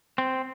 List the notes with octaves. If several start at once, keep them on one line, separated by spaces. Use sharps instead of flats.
C4